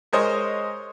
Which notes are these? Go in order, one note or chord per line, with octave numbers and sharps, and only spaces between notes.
G#3 A#4 C5 C#5 D#5